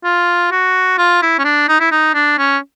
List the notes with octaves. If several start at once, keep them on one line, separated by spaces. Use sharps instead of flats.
F4
F#4
F4
E4
C#4
D4
D#4
E4
D#4
D4
C#4